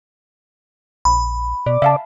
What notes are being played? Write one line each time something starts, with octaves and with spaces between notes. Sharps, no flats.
A#1 B5
B2 D5
C#3 E5 F5 A5